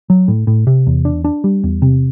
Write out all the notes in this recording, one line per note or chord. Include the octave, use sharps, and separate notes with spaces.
F#3
A2
A2
C3
E2
D4
D4
G3
E2
C3